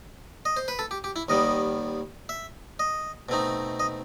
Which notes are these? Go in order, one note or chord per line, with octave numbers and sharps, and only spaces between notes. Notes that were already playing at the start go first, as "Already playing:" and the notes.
D#5
C5
B4
A4
G4
G4
E4
D#2 D#3 G3 B3 D#5
E5
D#5
B2 A3 C4 D#4
D#5